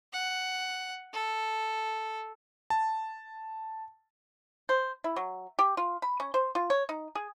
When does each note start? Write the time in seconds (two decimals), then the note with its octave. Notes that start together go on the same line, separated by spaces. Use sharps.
0.13 F#5
1.14 A4
2.70 A5
4.69 C5
5.04 E4
5.16 F#3
5.59 G4
5.77 F4
6.02 B5
6.20 C#4
6.34 C5
6.55 F4
6.70 C#5
6.89 D#4
7.15 G#4